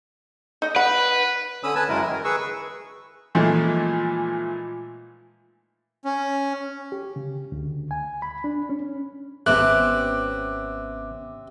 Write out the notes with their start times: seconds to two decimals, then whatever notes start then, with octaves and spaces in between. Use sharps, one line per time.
0.62 D#4 D#5
0.76 B4 F#5
1.64 D3 C#4 B5 D#6 E6
1.75 B4 G#5 A5
1.88 F#2 C#3 G#3 E4 A#4
2.06 D#3 A#4
2.24 G#4 B4 C#6 E6
3.35 A#2 E3 F3 G#3 A3 D#4
6.05 C#4
6.92 G4
7.16 C#3
7.52 D2
7.91 G#5
8.22 B5
8.44 D4
8.69 C#4
9.46 G#1 C3 B3 C#4 D6 F#6